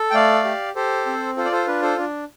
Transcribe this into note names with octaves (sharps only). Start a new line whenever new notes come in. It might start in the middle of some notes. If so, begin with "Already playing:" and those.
Already playing: A4
G5
A3 D5 F5
G4
G4 A4 C5
C4
F4 A4 C5
D5
A4 C5
D4 B4
A4 C5
D4